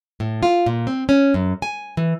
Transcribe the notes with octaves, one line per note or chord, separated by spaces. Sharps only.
A2
F4
A#2
C4
C#4
F#2
G#5
E3